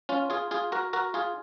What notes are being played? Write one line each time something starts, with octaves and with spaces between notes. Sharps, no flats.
C#4 F4
F4 G#4
F4 G#4
F#4 A#4
F#4 A#4
F4 G#4